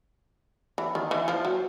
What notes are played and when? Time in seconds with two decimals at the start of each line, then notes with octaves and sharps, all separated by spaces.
0.78 E3
0.95 D#3
1.11 E3
1.28 F3
1.45 F#3